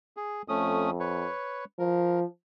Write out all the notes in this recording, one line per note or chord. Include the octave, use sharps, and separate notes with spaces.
G#4
F2 A3 C#4 D#6
B4 C#5
F3 A#4